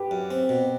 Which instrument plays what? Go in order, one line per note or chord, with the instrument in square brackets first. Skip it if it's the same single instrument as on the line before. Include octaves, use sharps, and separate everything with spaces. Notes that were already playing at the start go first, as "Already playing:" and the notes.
Already playing: [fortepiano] G4 B4
[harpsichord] F#2
C4
B2